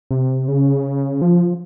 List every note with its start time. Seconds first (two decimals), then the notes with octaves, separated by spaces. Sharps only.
0.11 C3
0.48 C#3
1.22 F3